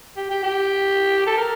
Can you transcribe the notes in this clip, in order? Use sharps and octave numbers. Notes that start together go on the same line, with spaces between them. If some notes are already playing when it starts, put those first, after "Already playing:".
G4
G4
G4
A4
A#4